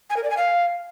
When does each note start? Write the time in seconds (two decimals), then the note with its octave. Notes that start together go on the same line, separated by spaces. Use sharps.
0.10 G#5
0.17 A#4
0.23 D5
0.30 G#5
0.37 F5